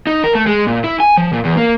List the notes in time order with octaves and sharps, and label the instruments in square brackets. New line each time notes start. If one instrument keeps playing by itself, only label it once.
[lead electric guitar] D#4
A#4
A3
G#3
A#2
E4
G#5
F3
A#2
E2
A#3